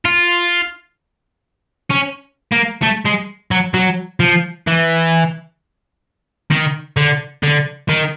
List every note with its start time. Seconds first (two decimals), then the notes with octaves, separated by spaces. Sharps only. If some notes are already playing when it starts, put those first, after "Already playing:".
0.05 F4
1.90 C#4
2.52 A#3
2.82 A3
3.05 G#3
3.51 F#3
3.74 F#3
4.20 F3
4.67 E3
6.51 D#3
6.97 D3
7.43 D3
7.89 D#3